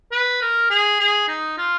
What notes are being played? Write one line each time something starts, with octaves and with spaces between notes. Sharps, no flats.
B4
A#4
G#4
G#4
D#4
F4